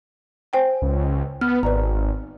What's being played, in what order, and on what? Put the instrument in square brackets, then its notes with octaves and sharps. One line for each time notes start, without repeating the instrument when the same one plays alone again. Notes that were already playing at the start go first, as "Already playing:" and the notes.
[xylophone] C5 G5 G#5
[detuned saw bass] C#2
[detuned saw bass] B3 [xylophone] F6
[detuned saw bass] G#1 [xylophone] B4 D5 A#5